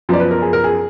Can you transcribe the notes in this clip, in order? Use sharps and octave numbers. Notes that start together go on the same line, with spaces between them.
F#2 F3 B3 D5
B4
A#4
G#4
A#4
G#4